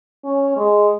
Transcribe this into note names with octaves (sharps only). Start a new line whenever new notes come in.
C#4
G#3